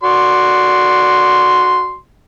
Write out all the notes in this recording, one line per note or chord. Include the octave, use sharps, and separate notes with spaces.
F#4 D5 C6